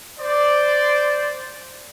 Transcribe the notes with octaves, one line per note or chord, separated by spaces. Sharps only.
C5 D5